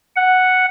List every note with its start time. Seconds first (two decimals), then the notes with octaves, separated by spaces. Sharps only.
0.16 F#5